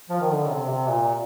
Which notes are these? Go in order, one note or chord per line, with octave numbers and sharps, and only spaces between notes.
F3
D#3
D3
C3
C3
A#2